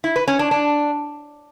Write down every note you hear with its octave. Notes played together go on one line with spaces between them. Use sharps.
E4
B4
C#4
D4
D4